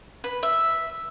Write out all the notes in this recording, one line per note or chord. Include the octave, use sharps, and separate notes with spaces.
B4
E5